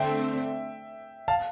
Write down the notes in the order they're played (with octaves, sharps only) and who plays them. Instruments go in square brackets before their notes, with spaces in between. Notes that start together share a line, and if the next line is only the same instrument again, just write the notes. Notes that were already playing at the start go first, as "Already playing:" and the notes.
Already playing: [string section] D3 A3 C4 [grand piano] E5 G5
[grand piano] F5 A5